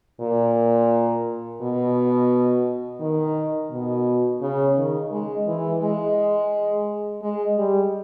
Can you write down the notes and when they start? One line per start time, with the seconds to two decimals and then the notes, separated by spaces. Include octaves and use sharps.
0.20 A#2
1.61 B2
3.01 D#3
3.71 B2
4.42 C#3
4.77 D#3
5.11 G#3
5.47 E3
5.81 G#3
7.22 G#3
7.57 G3